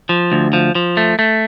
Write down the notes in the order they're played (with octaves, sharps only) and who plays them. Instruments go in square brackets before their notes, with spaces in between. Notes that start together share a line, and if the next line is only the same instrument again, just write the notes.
[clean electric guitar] F3
D2
F3
F3
A3
A3